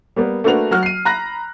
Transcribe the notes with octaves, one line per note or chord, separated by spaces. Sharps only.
G3 A#3 B3
A3 A#3 D4 F#4 B4 F7
F#3 F#4 F6
C7 D#7
A#5 B5 F#6 A#6